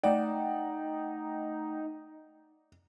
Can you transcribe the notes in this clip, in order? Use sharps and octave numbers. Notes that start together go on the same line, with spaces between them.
A3 D#4 D5 F#5 G5